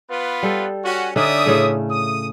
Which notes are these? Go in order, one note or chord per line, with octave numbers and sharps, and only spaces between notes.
B3 F4 B4
G3 A4
C#4 F#4
D3 C#4 D#4 D5 E5 D#6
A2 C#3 A3
D#6